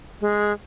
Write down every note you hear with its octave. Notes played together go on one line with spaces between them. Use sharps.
G#3